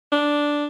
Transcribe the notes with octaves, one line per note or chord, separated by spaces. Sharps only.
D4